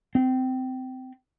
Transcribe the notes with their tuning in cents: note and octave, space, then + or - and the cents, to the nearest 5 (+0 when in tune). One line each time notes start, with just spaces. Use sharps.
C4 -20